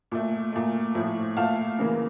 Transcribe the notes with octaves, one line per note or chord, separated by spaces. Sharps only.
A#2 A3
A#2 A3
A2 F3 A3
A#2 A3 F5 A5
C#3 E3 A#3